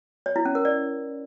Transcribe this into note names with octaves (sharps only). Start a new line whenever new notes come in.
C#5
E4
C#4
A#4
D5